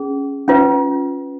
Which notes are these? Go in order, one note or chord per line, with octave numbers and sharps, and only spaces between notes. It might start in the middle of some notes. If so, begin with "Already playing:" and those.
Already playing: C#4 G#4
C#4 F4 B4